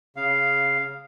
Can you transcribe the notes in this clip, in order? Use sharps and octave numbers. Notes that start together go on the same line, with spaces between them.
C#3 F5